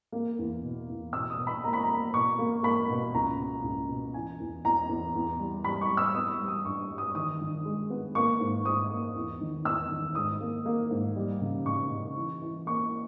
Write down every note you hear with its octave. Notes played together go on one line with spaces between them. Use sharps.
A#3
E2
B2
E2
B2 E6
D#6
B2
B5
A#3 A#5
B5
A#5
A#3
B2 C#6
A#3
A#3 B5
B2
C#2 A#5
B2
C#2
B2
E3 G#5
E2
E2 A#5
E2
E2
G3
G3 B5
C#6
G3
E6
B3 D#6
G3
D#6
G2 C#6
G3
D#6
D#3 D#6
D#3
G#3
B3
A#3 C#6
G#2
G#2 D#6
A#3
E2
D#3
E2 E6
D#3
G#2 D#6
A#3
A#3
G#2
G3
C#3
C#3 C#6
C#3
E3
E3
A#3 C#6